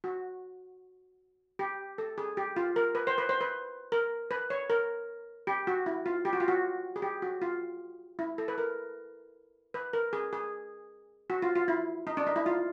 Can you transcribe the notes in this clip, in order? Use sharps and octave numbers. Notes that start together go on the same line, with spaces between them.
F#4
G4
A4
G#4
G4
F4
A#4
B4
C5
B4
C5
B4
A#4
B4
C#5
A#4
G4
F#4
E4
F4
G4
F#4
F4
F#4
G#4
G4
F#4
F4
E4
A4
B4
A#4
B4
A#4
G#4
G#4
F#4
F4
F4
E4
D#4
D4
D#4
E4
F4